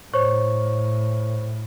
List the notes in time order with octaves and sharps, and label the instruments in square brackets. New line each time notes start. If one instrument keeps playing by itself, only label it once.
[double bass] A2 [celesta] C5 C#5 C#6